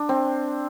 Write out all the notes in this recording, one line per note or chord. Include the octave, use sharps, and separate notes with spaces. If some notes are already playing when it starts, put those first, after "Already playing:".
Already playing: D4
C4